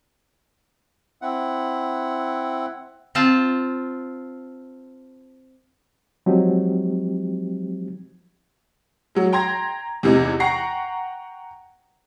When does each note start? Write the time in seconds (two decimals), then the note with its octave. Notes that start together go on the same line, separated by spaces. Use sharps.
1.22 C4 E4 F#5
3.15 C4 F4 A5
6.26 F3 F#3 G#3 C4 D#4 G4
9.15 F#3 G#3
9.33 G5 A#5 C6 G#6 A#6
10.03 E2 C3 E3 D#4
10.40 F#5 G5 A#5 C#6 A#6 C7